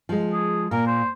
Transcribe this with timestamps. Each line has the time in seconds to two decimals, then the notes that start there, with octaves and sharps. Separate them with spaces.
0.09 F3 G#3
0.32 G#4
0.71 A#2 A#4
0.87 C5